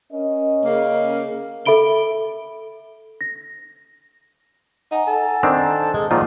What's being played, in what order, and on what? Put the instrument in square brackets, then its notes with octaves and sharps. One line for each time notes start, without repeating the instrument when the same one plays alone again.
[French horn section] C#4 A#4 D#5
[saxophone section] C#3 A#3
[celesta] A4 E5 B5 D7 G7
A#6
[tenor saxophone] D#4 [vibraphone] F#5 G#5 A#5
[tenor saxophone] A4
[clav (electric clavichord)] D#3 C4 D4
[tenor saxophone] G#3
[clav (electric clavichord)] A#2 D#3 F4 [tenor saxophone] F3 [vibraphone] G#3 F#5 D6